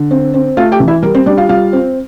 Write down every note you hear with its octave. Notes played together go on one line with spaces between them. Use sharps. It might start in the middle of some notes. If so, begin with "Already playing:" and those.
Already playing: D3
C4
C4
A3 F4 F5
G4 G5
E3
E4 E5
G3 A#4
C4 C5
G3 D4 D5
F4 F5
G3 F4 F5
C4